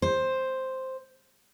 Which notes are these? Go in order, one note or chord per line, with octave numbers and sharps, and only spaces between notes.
C5